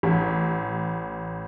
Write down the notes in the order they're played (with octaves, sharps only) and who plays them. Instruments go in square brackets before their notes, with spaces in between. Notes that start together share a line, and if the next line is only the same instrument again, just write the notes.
[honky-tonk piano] A1